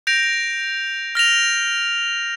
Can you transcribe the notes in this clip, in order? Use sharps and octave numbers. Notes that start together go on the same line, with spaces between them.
G6 A#6 D7 F7
F6 A#6 F7